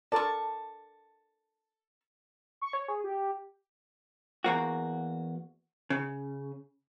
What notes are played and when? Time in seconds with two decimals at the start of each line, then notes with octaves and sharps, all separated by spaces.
0.12 A4 A#4 D5 A5 C#6
2.62 C#6
2.73 C#5
2.88 G#4
3.04 G4
4.44 E2 A#3 F#4
5.90 C#3